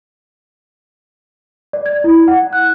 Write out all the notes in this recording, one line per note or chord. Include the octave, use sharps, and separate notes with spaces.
D5
G#6
E4
F#5
F#6